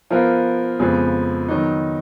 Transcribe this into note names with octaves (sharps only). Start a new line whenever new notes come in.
F3 B3 F4 A#4
F2 C#3 F3 G#3 B3
D#3 F#3 B3 D#4